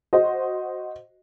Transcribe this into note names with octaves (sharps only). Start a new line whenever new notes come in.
F#4 C5 D#5